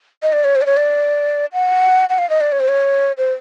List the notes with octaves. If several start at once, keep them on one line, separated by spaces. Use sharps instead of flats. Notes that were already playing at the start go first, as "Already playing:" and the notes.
D#5
D5
C#5
C5
D5
C#5
D5
F#5
F#5
F5
D#5
D5
C#5
C5
C#5
C5